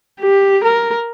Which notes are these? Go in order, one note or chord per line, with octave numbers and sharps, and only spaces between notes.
G4
A#4